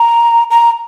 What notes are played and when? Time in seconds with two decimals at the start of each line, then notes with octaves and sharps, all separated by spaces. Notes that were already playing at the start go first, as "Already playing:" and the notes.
Already playing: A#5
0.51 A#5